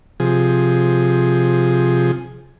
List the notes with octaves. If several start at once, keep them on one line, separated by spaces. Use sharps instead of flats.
C3 F3 G#4